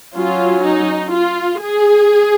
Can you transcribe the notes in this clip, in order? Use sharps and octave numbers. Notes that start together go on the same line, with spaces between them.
F#3 C#4 F4
D#4
F4
G#4